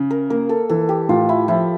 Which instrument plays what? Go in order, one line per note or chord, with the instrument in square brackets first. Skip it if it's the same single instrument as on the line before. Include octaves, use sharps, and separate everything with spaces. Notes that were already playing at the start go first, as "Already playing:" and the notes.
Already playing: [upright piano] C#3
[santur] A#4
[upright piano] A#3 [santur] A#4
[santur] A4
[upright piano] E3 [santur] A4
[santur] G4
[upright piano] A2 [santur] F4
[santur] E4
[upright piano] F3 [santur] E4